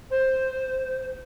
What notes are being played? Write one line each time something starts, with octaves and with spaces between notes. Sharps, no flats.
C5